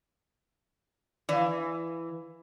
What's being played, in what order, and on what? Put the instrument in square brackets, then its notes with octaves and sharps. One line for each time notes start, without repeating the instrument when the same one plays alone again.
[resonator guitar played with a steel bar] E3 [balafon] D5 F5